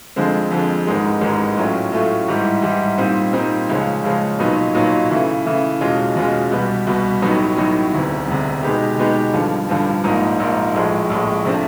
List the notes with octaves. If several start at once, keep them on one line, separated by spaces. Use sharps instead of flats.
F2 D3 F3 G#3 C4
F2 D3 F3 G#3 C4
A1 G#2 D#3 G#3
A1 G#2 D#3 G#3
A2 F#3 A3 C#4 F4
A2 F#3 A3 C#4 F4
G#2 E3 G3
G#2 E3 G3
A#2 G3 C4 D#4
A#2 G3 C4 D#4
C#2 C#3 F3 G#3 C#4
C#2 C#3 F3 G#3 C#4
B1 A#2 F#3 B3 D#4
B1 A#2 F#3 B3 D#4
C#3 E3 A3
C#3 E3 A3
E2 B2 G#3 C#4 F4
E2 B2 G#3 C#4 F4
C2 B2 G3 B3
C2 B2 G3 B3
A1 A2 F#3 B3 D#4
A1 A2 F#3 B3 D#4
E1 D2 C3
E1 D2 C3
B2 G#3 B3 D#4 G4
B2 G#3 B3 D#4 G4
A1 G2 D3 F3
A1 G2 D3 F3
A#1 G#2 F3 A#3 D#4
A#1 G#2 F3 A#3 D#4
A#1 A2 F3 G#3
A#1 A2 F3 G#3
C3 F3 A3 D4